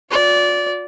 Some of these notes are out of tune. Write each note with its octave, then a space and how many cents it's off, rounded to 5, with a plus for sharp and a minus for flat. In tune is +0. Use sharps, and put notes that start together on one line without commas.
F4 +45 D5 -20